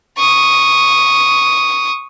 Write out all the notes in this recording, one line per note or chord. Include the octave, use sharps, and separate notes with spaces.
C#6 D#6